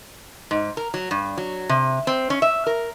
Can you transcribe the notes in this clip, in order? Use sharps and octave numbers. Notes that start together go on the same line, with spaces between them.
G#2
A#4
F#3
G2
F#3
C3
C4
C#4
E5
A#4